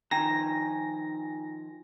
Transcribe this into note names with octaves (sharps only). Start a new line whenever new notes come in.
D#3 F3 G5 G#5 A#5 A#6